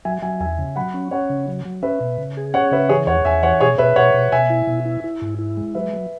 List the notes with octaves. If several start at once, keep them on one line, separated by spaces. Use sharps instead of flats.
F#3 E5 G#5
F#3 E5 G#5
E2 E5 G#5
C#3
F#3 F#5 B5
C#4
C#4 C#5 F#5
C#3
F#3
F#3
C#4 B4 E5
B2
C#3
G#4
C#4 C#5 F#5
C#3 B4 E5
E3 G#4 C#5
E2 C#5 F#5
E2 E5 G#5
E3 C#5 F#5
B2 G#4 C#5
B2 B4 E5
B2 C#5 F#5
B2
B2 E5 G#5
E4
B2
E4
E4
G#2
E4
G#3
F#3 B4 E5
F#3